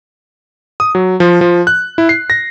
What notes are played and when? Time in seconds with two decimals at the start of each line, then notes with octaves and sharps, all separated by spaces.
0.80 D#6
0.95 F#3
1.20 F3
1.41 F3
1.67 F#6
1.98 E4
2.09 C7
2.30 A#6